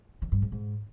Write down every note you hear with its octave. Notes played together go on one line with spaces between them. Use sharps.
D#3
G2
G#2
G#2